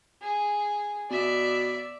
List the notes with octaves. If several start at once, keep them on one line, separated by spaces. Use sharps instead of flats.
G#4
B2 D5 E5